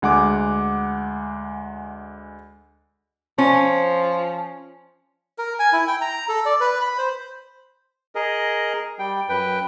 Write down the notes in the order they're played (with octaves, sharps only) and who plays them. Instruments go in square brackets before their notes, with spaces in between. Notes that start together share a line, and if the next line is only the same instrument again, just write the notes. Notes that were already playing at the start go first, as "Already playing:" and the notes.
[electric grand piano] D2 G#3 F#5 G#5 D6
[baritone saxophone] F3 [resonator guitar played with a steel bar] C#4
[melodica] A#4
G#5
E4
G5
A#5
A4
D5
B4
B5
C5
[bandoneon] G#4 A#4 D#5
G3 G5
F#2 B4 G5